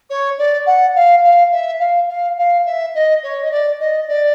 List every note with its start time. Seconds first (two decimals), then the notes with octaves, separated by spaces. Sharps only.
0.09 C#5
0.38 D5
0.66 F#5
0.95 F5
1.23 F5
1.51 E5
1.79 F5
2.08 F5
2.37 F5
2.65 E5
2.94 D#5
3.23 C#5
3.43 D#5
3.51 D5
3.79 D#5
4.08 D5